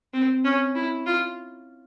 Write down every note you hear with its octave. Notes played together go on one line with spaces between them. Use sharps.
C4
C#4
E4
F4